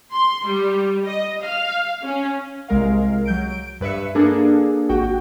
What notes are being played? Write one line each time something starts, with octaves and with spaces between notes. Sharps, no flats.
C6
G3
D#5
F5
C#4
C2 G#3 A#4 F5
F#3 G6 D7
D7
G2 B4 E5 C#7
A#3 D4 G#4 A4
G#1 F#4 G5